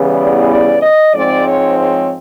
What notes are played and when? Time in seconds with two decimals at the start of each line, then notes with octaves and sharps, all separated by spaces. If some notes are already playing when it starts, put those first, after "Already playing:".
Already playing: E2 C#3 E3 G3 B3
0.15 D5
0.48 D5
0.81 D#5
1.14 G#2 F3 G#3 C4 D5
1.48 C#5
1.80 C#5